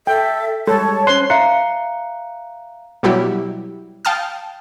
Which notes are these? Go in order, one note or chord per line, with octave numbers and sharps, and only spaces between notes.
A4 E5 G5
G3 G#3 A4 C#5 A5
C#4 C5 C#5 C6 F#6
E5 F5 A#5 F#6 C7 C#7
B2 F#3 G3 E4 F#4 G4
F5 G5 A5 D#6 F6